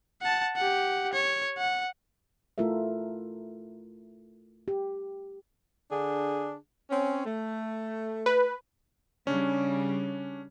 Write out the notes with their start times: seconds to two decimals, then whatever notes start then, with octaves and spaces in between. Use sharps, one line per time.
0.22 F#5 A5
0.56 G4 F#5
1.13 C#5
1.57 F#5
2.58 A3 E4 F4 A4 A#4 E5
4.68 G4
5.91 D3 D4 G#4
6.90 C4 C#4
7.26 A3
8.26 B4
9.27 C#3 G3 C#4 D4